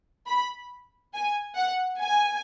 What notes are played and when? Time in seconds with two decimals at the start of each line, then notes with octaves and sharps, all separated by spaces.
0.28 B5
1.14 G#5
1.57 F#5
2.00 G#5